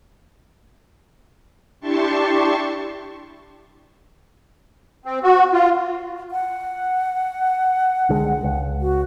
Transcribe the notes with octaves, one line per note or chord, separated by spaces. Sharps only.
D4 E4 G4 A5 C6 C#6
C4
F#4
F4
F#5
C2 D3 G#3
C#2
F#4